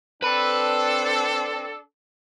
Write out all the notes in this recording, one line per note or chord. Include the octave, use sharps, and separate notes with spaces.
C4 D4 A4 B4 B5